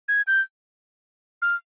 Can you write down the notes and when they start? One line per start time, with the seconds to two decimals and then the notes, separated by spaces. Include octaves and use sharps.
0.08 G#6
0.27 G6
1.42 F6